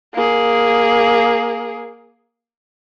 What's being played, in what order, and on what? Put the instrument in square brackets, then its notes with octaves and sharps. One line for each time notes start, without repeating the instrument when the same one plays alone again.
[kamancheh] A#3 G#4